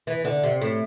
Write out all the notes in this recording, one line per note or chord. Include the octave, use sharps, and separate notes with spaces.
E3
D3
C3
A2